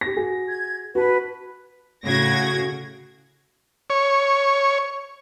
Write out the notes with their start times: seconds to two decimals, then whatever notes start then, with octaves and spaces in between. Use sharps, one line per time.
0.01 G4 A#6
0.16 F#4 G#4
0.48 G#6
0.95 F#4 B4 A5
2.04 A2 C#3 F#4 G#6 A#6
3.90 C#5